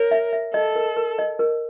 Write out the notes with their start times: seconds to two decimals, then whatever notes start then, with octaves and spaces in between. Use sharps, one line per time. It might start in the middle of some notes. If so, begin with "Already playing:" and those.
Already playing: A#4 C#5
0.11 E5
0.33 E5
0.54 A4 D#5
0.75 A#4
0.97 A#4
1.19 D#5
1.39 A#4